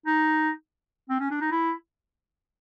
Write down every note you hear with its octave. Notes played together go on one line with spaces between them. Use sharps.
D#4
C4
C#4
D4
D#4
E4